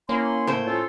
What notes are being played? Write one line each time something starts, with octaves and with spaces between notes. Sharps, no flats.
A#3 C#4 E4 C6
A2 C5
C#4 F4 A4